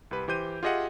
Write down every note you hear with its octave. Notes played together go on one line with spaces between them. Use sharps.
C2 G4 B4
E3 G4 C5 G6 D#7
F4 G4 G#4 D#5 E5 F#5